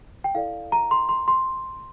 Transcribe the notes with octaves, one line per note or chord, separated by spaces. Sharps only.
G5
E4 A4 D5 F5
A#5
C6
C6
C6